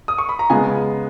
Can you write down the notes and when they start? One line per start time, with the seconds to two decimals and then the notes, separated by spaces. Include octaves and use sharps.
0.08 D#6
0.18 C#6
0.29 B5
0.39 A#5
0.50 C#3 G#3 B3 G#5